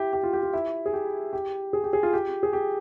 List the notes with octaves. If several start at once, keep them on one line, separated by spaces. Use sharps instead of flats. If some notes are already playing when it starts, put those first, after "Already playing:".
Already playing: E4 G4
G4
F4
G4
F4
E4
G#4
G4
G4
G#4
G4
G#4
F4
G4
G#4
G4